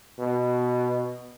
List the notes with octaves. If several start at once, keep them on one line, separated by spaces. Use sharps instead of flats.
B2